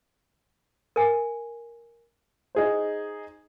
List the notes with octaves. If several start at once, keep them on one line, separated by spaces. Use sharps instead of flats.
A#4 G#5
D#4 G#4 C5